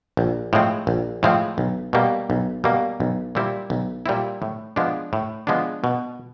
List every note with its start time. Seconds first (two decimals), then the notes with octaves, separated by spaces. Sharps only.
0.17 A#1
0.53 A2 F3 G#3 C4
0.87 A#1
1.23 A2 F3 G#3 C4
1.58 B1
1.93 B2 G3 A#3
2.30 B1
2.64 B2 G3 A#3
3.00 B1
3.35 A#2 G3 C4 E4
3.70 B1
4.06 A#2 G3 C4 E4
4.42 A2
4.76 F3 G#3 B3 D4
5.13 A2
5.47 F3 G#3 B3 D4
5.84 B2